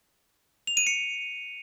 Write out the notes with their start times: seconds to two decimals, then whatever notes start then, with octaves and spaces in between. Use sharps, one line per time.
0.67 F7
0.77 D#7
0.87 C#7